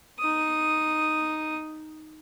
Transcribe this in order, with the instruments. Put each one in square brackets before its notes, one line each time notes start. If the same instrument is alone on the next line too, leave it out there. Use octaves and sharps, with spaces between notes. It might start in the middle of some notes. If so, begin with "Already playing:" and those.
[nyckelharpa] D#4 D#6